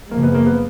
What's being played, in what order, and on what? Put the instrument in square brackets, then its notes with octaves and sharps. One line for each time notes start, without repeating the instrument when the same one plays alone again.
[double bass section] F#2 C#3 F3 G#3 [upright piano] A#3
[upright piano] B3
A#3
B3